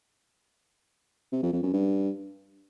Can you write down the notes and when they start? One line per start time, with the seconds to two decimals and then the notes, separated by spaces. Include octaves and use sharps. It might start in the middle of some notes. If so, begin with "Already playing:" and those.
1.32 C3
1.43 F2
1.53 F2
1.63 F#2
1.73 G2